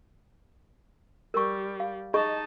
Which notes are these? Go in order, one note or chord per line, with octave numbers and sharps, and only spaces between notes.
G3 A#4 C#6
F5
D#4 G#4 D#5 A5 C#6